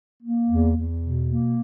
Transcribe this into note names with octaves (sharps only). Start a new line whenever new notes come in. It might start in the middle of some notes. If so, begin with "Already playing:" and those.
A#3
E2
E2
B2
A#3